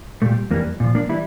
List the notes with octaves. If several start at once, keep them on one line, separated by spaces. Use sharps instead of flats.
A#2 G3 A3
F2 E3 G3 A#3
A#2 F3
A#3 D4
E3 G3 E4